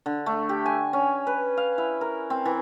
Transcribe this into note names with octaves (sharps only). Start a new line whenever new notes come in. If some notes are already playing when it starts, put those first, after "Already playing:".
D3
A3
G4
G#5
C#4
B4
F5
E4
A#4
C4
E3